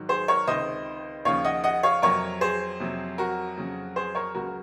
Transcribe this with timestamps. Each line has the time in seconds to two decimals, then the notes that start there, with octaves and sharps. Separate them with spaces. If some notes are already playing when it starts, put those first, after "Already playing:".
Already playing: G#2 D#3 F#3
0.09 G#4 C5
0.28 A#4 C#5
0.47 C#2 C3 D#3 C5 D#5
1.25 D#2 C#3 F3 C#5 F5
1.44 D#5 F#5
1.64 D#5 F#5
1.83 C#5 F5
2.02 F2 C3 F#3 A#4 C#5
2.41 G#4 C5
2.80 F2 C3 F#3
3.18 F#4 A#4
3.57 F2 C#3 F#3
3.96 G#4 C5
4.15 A#4 C#5
4.35 C#2 C#3 F#3 F#4 A#4